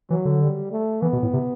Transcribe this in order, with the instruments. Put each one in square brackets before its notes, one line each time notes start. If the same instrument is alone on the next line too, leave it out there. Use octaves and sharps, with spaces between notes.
[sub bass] E3 [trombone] F#3
[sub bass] D3
[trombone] G3
A3
[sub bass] E3 [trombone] B3
[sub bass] B2
A2
C3